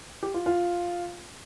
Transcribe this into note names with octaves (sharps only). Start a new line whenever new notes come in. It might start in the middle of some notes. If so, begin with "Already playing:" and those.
G4
F4
F4